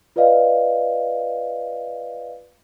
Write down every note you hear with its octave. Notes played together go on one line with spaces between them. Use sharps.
F4 B4 D5 D#5 F5